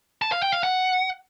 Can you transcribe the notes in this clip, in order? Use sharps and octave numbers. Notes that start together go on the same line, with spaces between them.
A5
F5
G5
F5
F#5